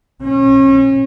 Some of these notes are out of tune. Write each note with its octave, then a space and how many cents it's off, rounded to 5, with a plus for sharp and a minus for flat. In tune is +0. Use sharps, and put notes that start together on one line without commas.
C#4 -35